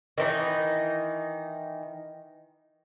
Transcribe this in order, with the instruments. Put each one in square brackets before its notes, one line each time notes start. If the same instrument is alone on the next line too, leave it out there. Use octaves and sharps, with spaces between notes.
[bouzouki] D#3 E3 D#4